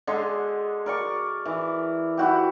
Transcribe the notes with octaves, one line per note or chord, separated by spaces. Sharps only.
D3 G#3 G#4 C6
A#4 D5 C#6 D6
E3
E4 F#4 G4